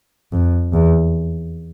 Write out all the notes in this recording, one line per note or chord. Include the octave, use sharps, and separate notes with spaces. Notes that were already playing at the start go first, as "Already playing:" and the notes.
F2
E2